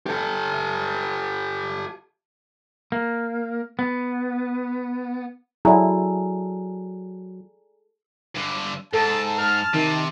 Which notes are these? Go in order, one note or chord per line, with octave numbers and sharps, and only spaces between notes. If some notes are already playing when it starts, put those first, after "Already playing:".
G4 A4
A#3
B3
F#3 E4 G#4 A4 D5 G#5 A#5
G2 D3
G#2 A4 A5
A5 F6
C3 D#3